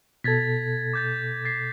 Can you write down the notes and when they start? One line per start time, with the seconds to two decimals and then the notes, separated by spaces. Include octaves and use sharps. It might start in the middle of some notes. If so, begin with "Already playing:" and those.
0.24 B2 A4 G#6 A6 B6
0.93 D6 G6 A6
1.45 A6 B6 C7